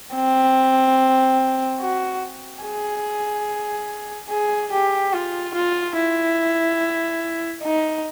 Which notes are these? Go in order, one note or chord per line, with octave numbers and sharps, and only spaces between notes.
C4
F#4
G#4
G#4
G4
F4
F4
E4
D#4